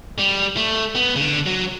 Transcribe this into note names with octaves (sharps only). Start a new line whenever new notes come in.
G3
A3
B3
C#3
D3
F#3